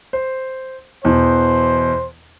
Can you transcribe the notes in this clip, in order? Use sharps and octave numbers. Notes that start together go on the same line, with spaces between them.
C5
E2 B2 E3 C5